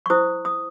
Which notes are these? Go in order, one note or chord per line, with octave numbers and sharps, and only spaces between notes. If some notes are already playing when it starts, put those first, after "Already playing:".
C#6
E4 C5 D#6
D#6